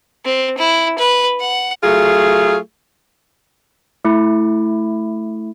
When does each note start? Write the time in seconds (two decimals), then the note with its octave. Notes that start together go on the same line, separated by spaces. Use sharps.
0.25 C4
0.58 E4
0.98 B4
1.40 F#5
1.83 F#3 A3 F4 G#4
4.05 A3 E4